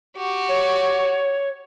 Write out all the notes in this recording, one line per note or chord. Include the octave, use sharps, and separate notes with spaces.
F#4 G4
C#5